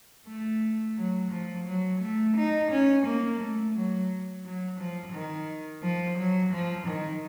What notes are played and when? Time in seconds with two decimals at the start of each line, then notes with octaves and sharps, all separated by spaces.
0.27 A3
0.97 F#3
1.31 F3
1.66 F#3
2.01 A3
2.36 D#4
2.71 C#4
3.06 A#3
3.39 A3
3.74 F#3
4.44 F#3
4.79 F3
5.13 D#3
5.82 F3
6.18 F#3
6.52 F3
6.87 D#3